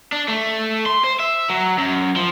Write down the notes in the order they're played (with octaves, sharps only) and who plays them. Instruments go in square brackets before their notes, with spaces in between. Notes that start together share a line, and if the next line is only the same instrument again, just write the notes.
[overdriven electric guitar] D4
A3
C6
C5
E5
F#3
F#2
F3